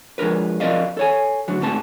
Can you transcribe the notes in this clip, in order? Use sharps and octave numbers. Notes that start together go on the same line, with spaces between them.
F3 G#3 D4 A#4 B4
F3 C4 A#4 D5 D#5 F5
A4 C#5 G#5
D2 D3 F#3
G#2 A3 B3 C4 A5